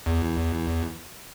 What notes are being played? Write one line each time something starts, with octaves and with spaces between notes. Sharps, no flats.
E2